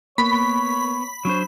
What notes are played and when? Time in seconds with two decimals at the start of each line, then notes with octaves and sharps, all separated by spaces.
0.18 A#3 B3 C#5 B5
1.25 F#3 D4 C5 C#5